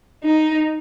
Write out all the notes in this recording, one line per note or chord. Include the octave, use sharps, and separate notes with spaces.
D#4